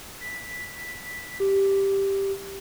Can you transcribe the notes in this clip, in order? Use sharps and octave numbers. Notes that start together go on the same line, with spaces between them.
B6
G4